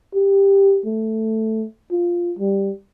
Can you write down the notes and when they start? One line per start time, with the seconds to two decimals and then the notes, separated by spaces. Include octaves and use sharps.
0.15 G4
0.86 A3
1.91 F4
2.39 G3